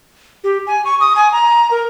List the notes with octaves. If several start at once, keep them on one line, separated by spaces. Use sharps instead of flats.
G4
G#5
C#6
D#6
G#5
A#5
A#4